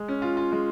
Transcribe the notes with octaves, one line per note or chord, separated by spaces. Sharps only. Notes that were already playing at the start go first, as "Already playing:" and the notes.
Already playing: G#3
C#4
F4
F4
G#3